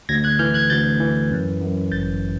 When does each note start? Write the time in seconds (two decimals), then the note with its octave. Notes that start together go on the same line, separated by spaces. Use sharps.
0.09 D2 G#6 A#6
0.24 F#6 G#6
0.39 E3 F6 G6
0.54 F#6 G#6
0.70 D2 G6 A6
1.00 E3
1.31 F#2
1.61 F#2
1.92 G1 G6 A6